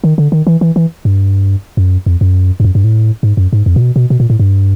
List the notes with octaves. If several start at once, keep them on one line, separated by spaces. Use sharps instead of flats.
D#3
D3
D#3
E3
E3
E3
G2
F#2
F2
F#2
G2
F#2
G2
A2
G#2
F#2
G#2
F2
A#2
B2
B2
B2
A#2
A2
G2